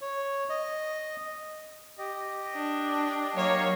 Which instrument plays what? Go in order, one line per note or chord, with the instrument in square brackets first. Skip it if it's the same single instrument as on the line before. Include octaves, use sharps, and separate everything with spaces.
[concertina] C#5
D#5
[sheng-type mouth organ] G4 D#5
[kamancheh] D4
[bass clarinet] F#3 [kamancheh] A#3 C#5